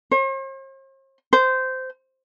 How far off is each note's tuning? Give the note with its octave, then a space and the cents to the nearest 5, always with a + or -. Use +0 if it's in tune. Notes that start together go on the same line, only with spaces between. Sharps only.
C5 +45
C5 -15